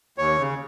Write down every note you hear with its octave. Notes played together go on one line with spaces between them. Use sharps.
D#2 C#5
C#3